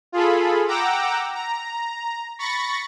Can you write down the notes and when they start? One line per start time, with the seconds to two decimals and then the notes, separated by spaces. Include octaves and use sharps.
0.12 F4 G#4 A4 B5
0.68 F#5 G5 A#5 D6 E6
1.35 A#5
2.39 B5 C#6 A6 A#6 C#7